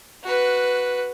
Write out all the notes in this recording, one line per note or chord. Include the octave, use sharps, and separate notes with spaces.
F#4 B4